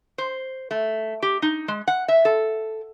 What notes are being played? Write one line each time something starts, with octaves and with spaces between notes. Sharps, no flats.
C5
A3
G4
D#4
G#3
F#5
E5
A4